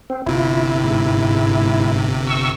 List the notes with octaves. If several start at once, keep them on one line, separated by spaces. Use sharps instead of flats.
C4
G1 C3 E4 F4
G#2
C#6 E6